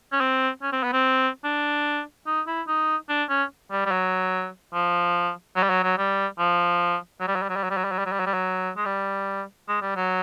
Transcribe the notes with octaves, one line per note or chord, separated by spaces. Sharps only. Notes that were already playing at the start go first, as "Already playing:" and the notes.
C#4
C4
C#4
C4
B3
C4
D4
D#4
E4
D#4
D4
C#4
G3
G3
F#3
F3
F#3
G3
F#3
F#3
G3
F3
F#3
G3
F#3
G3
F#3
G3
F#3
G3
F#3
G3
F#3
G3
F#3
G3
F#3
G3
F#3
G#3
G3
G#3
G3
F#3